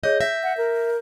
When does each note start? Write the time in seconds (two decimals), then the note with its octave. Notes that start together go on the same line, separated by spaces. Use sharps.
0.03 G#4 C#5 D#5 G6
0.21 E5 G6 A#6
0.43 F#5
0.57 A#4